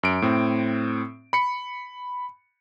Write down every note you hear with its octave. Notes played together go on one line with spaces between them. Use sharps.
F#2 D7
A2 C4
B5 C#7